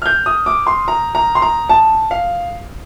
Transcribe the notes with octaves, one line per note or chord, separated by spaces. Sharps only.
F6
G6
D#6
D6
C6
A#5
A#5
C6
A#5
A5
F5